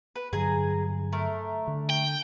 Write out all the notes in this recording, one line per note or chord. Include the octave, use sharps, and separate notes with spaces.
B4
G2 D3 F#3 G#4 A#5
A3 A#4
D3
G5